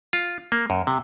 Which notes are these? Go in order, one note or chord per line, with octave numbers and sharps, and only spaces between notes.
F4
A#3
F#2
C3